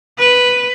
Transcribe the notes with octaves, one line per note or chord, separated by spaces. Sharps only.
B4